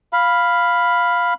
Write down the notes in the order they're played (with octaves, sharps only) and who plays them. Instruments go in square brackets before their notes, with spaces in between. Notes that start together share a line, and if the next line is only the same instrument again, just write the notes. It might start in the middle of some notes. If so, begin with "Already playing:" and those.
[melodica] F5 B5